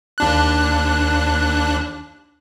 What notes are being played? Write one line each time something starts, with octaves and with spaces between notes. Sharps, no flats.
D#2 D4 F#6